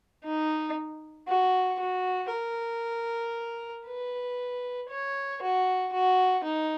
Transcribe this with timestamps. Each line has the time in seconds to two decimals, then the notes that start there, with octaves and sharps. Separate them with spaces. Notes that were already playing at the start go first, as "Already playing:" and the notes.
0.25 D#4
1.28 F#4
1.79 F#4
2.31 A#4
3.87 B4
4.90 C#5
5.42 F#4
5.93 F#4
6.44 D#4